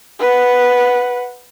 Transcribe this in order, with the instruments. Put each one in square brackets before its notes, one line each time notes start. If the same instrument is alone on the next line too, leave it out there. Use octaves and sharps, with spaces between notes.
[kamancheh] B4 F#5